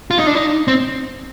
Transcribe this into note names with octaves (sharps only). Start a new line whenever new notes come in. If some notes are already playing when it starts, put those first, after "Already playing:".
F4
D#4
D4
D#4
C4